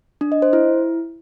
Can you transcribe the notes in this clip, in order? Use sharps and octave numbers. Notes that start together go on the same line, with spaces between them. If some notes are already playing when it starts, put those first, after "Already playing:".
D4
D#5
C5
E4